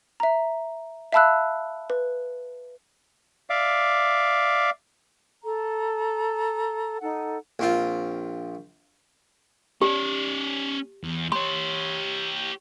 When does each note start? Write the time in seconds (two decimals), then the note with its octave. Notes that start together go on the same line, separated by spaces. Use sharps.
0.20 E5 A#5
1.13 E5 F5 A5 B5 E6 F#6
1.90 B4
3.50 D5 E5 F5 D6
5.43 A4 A#5
7.01 D#4 A4 F#5
7.59 A#1 C4 F4
9.82 C#4 G4 D5
11.04 E2
11.32 G4 C#5 C6